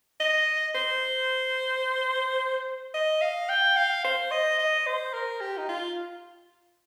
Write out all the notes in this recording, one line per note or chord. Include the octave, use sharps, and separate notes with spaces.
D#5
C5
D#5
F5
G5
F5
C5
D#5
D#5
C5
A#4
G4
D#4
F4